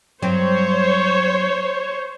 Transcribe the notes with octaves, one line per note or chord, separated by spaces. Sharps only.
G2 F#3 C4 C5 C#5